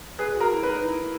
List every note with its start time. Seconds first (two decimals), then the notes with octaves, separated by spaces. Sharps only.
0.18 G#4 B4
0.35 F#4
0.40 A#4
0.52 E4
0.63 B4
0.70 D#4
0.85 E4